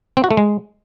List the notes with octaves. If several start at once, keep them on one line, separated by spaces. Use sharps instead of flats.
C4
F#4
A3
G#3